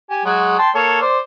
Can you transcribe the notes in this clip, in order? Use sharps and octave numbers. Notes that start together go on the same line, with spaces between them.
G4 G#5
F#3 G#3 F#4
G5 A5 C6
A#3 A4 C#5
C5 D5